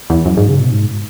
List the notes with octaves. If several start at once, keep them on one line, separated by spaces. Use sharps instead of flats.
E2
F#2
G#2
C#3
B2
G#2